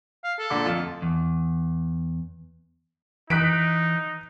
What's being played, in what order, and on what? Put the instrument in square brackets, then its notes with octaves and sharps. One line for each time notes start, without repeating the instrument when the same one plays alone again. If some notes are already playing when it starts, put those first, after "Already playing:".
[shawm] F5
A4
[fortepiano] A#2 D3 D6
F2 F4
[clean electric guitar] E2
[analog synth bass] E3 [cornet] D#4 [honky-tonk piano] F#6 B6 D7